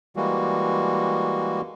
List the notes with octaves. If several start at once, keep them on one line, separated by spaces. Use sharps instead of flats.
E3 G3 G#3 A#3 F#4